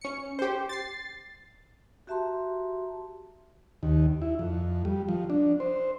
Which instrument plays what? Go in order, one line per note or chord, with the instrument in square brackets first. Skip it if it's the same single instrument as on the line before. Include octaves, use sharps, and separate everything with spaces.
[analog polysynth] C#4 C#7
G4 C5
A6 C7
[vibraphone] F#4 G4 E5 A5 A#5 C6
[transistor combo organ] D#2
E4
F2
G3
F3
D4
C5